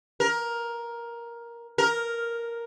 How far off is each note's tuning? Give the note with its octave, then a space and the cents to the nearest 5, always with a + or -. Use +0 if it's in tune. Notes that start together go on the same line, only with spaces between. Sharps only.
A#4 +10
A#4 +0